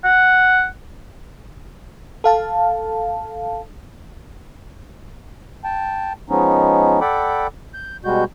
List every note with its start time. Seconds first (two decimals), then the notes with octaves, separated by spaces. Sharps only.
0.04 F#5
2.24 A4 F5 A5
5.64 G5 A5
6.30 F3 G#3 B3 C#4 D#4
7.01 A4 D5 F#5 G5 B5 D6
7.74 G6
8.05 B2 G3 G#3 F#4 G6